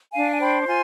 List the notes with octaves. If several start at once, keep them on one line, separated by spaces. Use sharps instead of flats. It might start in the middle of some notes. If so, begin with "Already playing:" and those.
D4 F5 G#5
G#5
C5 G5 B5
D6
F4 G#5 C6